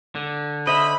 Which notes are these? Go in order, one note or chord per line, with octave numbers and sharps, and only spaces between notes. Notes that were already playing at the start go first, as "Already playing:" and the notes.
D3
C5 D#5 E5 B5